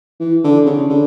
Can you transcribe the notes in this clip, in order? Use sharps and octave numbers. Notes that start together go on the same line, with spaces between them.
E3
D3
C#3
D3